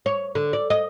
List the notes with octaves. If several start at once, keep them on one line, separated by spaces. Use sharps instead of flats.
C#5
D3
D5
D#5